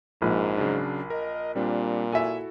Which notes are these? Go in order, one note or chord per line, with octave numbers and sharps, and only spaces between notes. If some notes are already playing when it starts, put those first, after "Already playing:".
A#1 G#2
C#3 F#3 D4
A#4 D#5
A#2 G3 C4 D4
E4 F#4 A4 E5 G#5